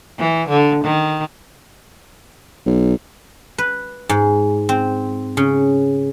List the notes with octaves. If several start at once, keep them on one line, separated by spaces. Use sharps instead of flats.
E3
D3
D#3
B1
B4
G#2
C4
C#3